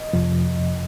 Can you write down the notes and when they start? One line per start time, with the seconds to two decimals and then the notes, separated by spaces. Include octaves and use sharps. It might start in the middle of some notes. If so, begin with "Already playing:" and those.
Already playing: D#5
0.13 F2 C3 F3